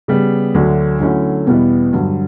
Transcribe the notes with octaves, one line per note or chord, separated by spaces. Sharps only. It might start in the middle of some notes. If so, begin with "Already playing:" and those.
C#3 G3 B3
D2 D3 F#3 A3 D4
D3 F#3 A3 C#4 E4
E2 B2 G3 B3 E4
G2 D3 F#3